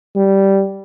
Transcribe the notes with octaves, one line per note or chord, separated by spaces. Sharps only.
G3